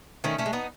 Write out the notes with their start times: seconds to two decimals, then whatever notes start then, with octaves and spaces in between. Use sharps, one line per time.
0.24 D#3 A3 C#4
0.38 A3 C#4
0.46 G#3
0.53 B3 D#4